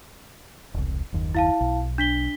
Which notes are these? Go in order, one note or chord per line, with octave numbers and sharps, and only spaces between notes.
E1 C2
F#1 D#2
E4 F5 A5
B1
D4 B6 G7